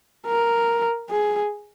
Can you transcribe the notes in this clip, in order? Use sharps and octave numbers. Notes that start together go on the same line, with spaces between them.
A#4
G#4